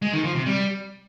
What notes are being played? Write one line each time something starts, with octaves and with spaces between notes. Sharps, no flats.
G#3
D#3
F3
C3
G3